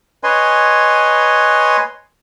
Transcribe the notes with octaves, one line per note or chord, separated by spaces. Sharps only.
B4 C#5 D#5 G#5 C6